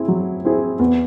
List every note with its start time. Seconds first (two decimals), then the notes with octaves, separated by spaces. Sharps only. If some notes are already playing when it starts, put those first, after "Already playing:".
Already playing: C4 E4 G#4
0.08 F#3
0.45 C4 E4 G#4
0.79 E2